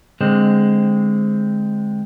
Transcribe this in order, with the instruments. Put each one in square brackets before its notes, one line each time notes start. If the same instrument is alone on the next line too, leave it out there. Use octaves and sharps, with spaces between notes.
[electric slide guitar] D3 G#3 C4